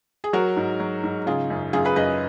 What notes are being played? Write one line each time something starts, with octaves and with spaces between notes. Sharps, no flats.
G#4
F#3 F#4 A#4
G#2
F#3
G#2
C#3 F4 G#4
F#2
F#2 F4 G#4
G#4 B4
F#2 B4 D#5